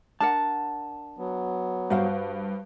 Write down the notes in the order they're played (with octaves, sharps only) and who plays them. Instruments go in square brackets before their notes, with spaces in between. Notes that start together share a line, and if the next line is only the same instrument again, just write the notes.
[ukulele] D4 A#4 F#5 [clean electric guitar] A5
[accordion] F#3 B3
[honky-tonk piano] G2 [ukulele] F#4 C5 F5